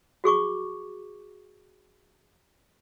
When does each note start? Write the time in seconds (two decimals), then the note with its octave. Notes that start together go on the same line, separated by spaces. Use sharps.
0.24 F#4 G#4 C#6 D6